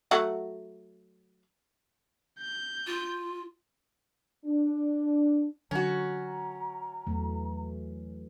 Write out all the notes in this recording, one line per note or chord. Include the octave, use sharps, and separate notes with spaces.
F#3 A3 F#4
G6
F4
D4
D3 F#3 C#4 F#4 A#5
E2 E3 F#3 A3